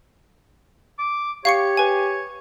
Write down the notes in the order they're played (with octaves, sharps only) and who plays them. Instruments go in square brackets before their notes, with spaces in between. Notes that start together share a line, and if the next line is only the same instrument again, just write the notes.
[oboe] D6
[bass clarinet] G4 [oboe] C#5 [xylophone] F5 C#6 C#7
[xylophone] B4 G#5